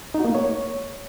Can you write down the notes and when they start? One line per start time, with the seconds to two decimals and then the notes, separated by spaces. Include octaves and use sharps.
0.14 D#4
0.20 F#4
0.25 A#3
0.30 A3
0.35 C#5